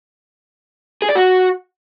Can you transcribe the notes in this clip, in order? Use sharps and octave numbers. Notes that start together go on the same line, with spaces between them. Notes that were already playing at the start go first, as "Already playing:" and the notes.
G#4
D5
F#4